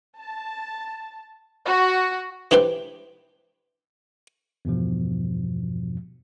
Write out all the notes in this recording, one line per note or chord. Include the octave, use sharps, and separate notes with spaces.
A5
F#4
E3 D4 G4 B4 C5 G5
E2 G2 B2 F3